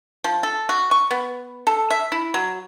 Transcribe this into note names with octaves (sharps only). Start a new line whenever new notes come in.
F3
A4
F#4
C#6
B3
A4
E5
E4
F#3